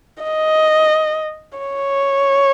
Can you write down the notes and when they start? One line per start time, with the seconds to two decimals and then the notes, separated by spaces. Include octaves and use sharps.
0.24 D#5
1.59 C#5